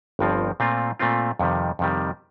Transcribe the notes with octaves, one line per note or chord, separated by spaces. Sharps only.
G1 G2 F3 C4
A#2 A3 C4 F4
A#2 A3 C4 F4
F2 C3 D#3 G3
F2 C3 D#3 G3